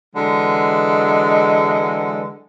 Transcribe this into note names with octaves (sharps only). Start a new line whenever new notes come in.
D3 E3 F#3 G#3